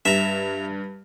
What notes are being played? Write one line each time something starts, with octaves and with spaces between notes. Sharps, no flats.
G2 E5 A#5